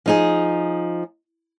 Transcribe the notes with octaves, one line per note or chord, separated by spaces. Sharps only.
F3 D#4 G#4